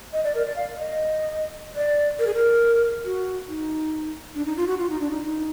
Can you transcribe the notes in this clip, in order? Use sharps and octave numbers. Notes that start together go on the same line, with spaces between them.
D#5
D5
A#4
D5
F5
D#5
D5
A#4
G#4
A#4
F#4
D#4
D4
D#4
F4
F#4
F4
D#4
D4
D#4
D#4